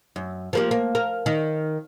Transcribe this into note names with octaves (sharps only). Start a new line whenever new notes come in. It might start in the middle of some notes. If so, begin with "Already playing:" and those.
F#2
F3 A#3 G4
A#3
A#4
D#3